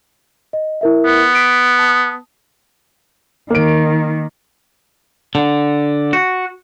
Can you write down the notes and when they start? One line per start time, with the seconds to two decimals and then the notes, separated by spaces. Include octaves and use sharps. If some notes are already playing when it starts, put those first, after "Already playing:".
0.53 D#5
0.81 E4 A#4 E5
1.05 B3
1.33 B6 D7
1.79 A5 D#6
3.50 D#3 A#3 D7
5.35 D3
6.13 F#4